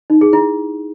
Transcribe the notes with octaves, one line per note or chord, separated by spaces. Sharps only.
D#4
G#4
E4